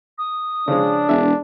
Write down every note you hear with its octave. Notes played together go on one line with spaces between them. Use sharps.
D#6
C#3 F3 G#3 D4
E1 G#3 E5